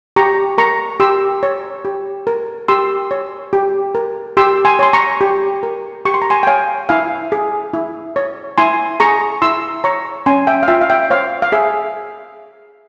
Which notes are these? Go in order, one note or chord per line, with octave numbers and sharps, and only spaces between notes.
G4 A#5 C#6
A#4 A#5 C#6
G4 C6 E6
C#5
G4
A#4
G4 C6 E6
C#5
G4
A#4
G4 C6 E6
G#5 C6
C#5 C6
A#5 C#6
G4
A#4
G4 C#6
C6
A#5
G#5 C6
G5
C#5 F5 G#5
E4 F5 G#5
G#4
E4
C#5
E4 G#5 C6
G#4 A#5 C#6
E4 C6 E6
C#5 A#5 C#6
C#4 G#5 C6
E5 G5
F5
F4 E5 G5
F5
E5 G5
C5 C#5 F5
F5
G#4 E5